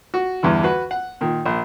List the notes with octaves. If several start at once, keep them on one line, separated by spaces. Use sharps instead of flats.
F#4
E2 G2 D3 E3
F#4 B4
F#5
A#2 D#3
A#1